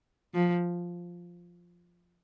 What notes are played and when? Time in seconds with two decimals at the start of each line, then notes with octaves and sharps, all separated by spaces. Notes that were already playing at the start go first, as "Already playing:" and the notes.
0.34 F3